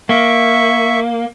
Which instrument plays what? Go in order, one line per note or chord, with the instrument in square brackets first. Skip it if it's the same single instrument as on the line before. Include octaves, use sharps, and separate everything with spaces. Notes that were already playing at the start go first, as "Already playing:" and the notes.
[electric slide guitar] A#3 [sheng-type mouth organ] E5 C#6